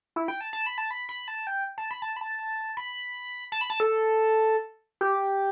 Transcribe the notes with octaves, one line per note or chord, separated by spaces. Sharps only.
E4
G5
A5
A5
B5
A5
B5
B5
A5
G5
A5
B5
A5
B5
A5
B5
A5
B5
A5
A4
G4